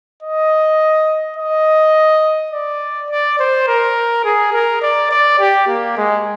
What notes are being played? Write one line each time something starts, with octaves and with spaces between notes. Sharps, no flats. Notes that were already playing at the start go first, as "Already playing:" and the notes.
D#5
D#5
D5
D5
C5
A#4
G#4
A#4
D5
D5
G4
A#3
G#3